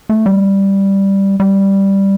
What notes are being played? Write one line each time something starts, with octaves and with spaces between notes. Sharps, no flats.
A3
G3
G3